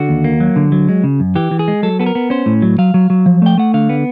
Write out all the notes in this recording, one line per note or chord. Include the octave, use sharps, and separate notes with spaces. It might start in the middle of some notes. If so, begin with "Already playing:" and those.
Already playing: D3 F#4
D#2
A#3
F#3
D3
F#3
G#3
C#3
F#2
E3 G4
E3
G#4
G#3
F#3 A4
B3 A4
A#4
B3
C#4 C5
A2
F#3
F#3 F5
F#3
F#3
F3
A3 G5
A3 F#5
D3 F5
B3